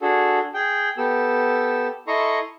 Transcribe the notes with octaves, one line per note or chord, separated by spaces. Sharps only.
D4 F#4 G#4 A4
G#4 G5
B3 G4 A4 E6
E4 A4 D#5 A#5 C6 C#6